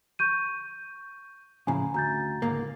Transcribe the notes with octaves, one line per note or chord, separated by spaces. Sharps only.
C#6 G6 D#7
F2 A2 C#3 G#5 A#5 B5
D2 A#5 G6 A6
C#2 G#2 A#3